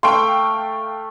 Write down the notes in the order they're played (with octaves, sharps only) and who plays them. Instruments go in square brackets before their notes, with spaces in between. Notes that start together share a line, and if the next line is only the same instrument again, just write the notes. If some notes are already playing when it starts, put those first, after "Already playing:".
[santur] A3 [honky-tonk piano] F5 G5 [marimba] C6